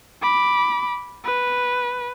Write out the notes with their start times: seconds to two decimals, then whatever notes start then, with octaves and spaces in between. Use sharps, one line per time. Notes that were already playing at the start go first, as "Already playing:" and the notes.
0.23 B5 D6
1.24 B4